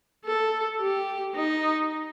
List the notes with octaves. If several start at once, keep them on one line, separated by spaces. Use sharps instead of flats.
A4
G4
D#4